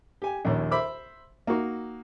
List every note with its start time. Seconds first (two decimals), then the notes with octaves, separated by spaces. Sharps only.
0.22 G4 G#5
0.45 A#1 D#2 C#4
0.71 C5 E5 B5 D6
1.47 A#3 D#4 F#4